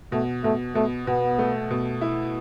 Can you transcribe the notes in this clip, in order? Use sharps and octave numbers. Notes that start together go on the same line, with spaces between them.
B2 A3
B2 A3
B2 A3
B2 B3
A3
B2
E4